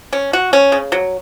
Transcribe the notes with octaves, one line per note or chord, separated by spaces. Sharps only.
C#4
F#4
C#4
C#3
F#3